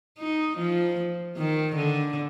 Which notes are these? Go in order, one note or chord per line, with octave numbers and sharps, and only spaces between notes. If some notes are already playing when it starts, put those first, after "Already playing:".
D#4
F3
D#3
D3